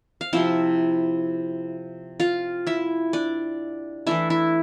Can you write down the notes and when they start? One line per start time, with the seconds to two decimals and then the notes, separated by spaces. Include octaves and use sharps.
0.21 F5
0.33 C3 F3 C4 E4 E5
2.20 F4 F5
2.67 E4 E5
3.13 D4 D5
4.07 E3 A3 D4 E4 E5
4.30 E4 E5